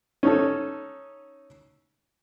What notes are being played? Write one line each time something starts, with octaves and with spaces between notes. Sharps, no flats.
C#4 D#4 A4